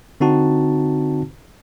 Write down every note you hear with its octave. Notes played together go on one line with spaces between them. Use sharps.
D3 C4 D#4 F#4 A5